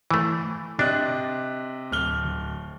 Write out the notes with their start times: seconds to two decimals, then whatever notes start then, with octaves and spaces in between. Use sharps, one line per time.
0.11 E3 A3
0.79 C3 D4 D#5 F#6
1.91 D1 F6 G7